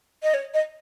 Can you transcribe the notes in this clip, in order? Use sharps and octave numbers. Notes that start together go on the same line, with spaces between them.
D#5
C#5
D#5